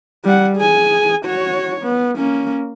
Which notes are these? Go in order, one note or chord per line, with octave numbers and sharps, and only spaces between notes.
G3 F#5
G#4 G#5
F#4 C#5
B3
A#3 C#4